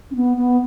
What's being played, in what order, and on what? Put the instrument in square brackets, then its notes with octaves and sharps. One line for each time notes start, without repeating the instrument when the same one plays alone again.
[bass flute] C#4
B3
B3